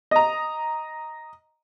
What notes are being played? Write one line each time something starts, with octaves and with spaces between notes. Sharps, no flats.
D#5 A#5